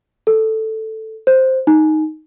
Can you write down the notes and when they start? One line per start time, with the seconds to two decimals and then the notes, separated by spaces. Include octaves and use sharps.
0.27 A4
1.27 C5
1.67 D#4